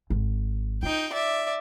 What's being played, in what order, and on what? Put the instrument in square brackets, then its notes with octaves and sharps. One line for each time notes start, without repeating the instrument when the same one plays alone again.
[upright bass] G#1
[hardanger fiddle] D#4 G5 [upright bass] F4
[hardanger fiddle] D5 E5